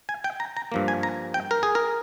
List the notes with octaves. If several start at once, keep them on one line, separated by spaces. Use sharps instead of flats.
G#5
G5
A#5
A#5
G2 F3 A#3
G#5
A#5
G5
A#4
G#4
A#4